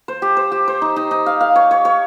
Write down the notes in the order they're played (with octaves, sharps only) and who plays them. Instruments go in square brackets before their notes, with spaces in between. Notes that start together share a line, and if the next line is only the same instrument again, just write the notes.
[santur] C5
G4
C5
G4
C5
D#4
D#4
D#4
F5
F5
C#5
C#5
C#5